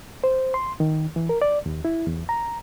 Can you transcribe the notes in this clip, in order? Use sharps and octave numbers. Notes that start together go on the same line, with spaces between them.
C5
C6
D#3
E3
A#4
D5
D#2
E4
E2
A#5